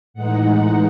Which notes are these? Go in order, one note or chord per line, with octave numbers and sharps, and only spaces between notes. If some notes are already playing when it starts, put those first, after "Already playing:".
A2 E3 G#3 D#4 F#5